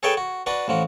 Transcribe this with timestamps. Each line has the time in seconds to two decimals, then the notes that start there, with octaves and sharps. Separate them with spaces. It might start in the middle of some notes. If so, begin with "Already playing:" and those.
0.03 G#4 A4 B4 C#5 E5 G5
0.17 F#4
0.46 D4 F#4 B4
0.68 A1 F3 F#4